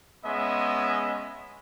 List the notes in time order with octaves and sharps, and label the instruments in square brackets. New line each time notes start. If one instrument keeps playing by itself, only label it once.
[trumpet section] G#3 B3 C#4 D#5 E5